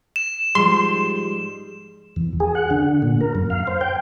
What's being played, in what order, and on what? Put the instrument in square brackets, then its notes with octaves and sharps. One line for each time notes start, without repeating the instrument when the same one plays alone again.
[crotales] E7
[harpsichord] G#2 [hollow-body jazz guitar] F3 G3 [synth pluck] C6
[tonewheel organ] E2
G#4
F#5
D3
A#2
A#4
F#2
F5
C5
G5